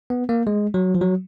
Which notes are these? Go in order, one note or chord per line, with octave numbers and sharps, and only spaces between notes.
B3
A#3
G#3
F#3
F3
F#3